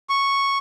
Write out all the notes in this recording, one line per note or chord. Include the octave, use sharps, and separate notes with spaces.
C#6